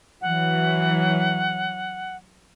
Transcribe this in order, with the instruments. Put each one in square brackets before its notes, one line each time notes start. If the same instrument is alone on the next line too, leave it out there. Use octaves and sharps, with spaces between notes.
[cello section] E3 F#3 [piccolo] F#5